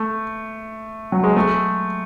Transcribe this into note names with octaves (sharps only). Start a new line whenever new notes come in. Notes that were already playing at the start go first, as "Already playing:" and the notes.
Already playing: A3
F#3
G#3
A3